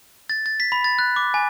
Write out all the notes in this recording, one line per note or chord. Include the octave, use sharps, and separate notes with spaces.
A6
A6
B6
B5
A6
F#6
D6
G#5